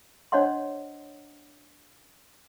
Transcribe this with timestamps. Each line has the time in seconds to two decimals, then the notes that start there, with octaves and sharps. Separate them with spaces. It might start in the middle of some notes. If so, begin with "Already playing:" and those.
0.32 D4 C5 C#5 D#5 F#5 C6